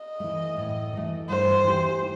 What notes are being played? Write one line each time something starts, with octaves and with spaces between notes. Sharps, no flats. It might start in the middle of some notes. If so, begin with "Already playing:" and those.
Already playing: D#5
E3 A3
A2
E3 A3
G2 C5
E3 A3 D#4 G4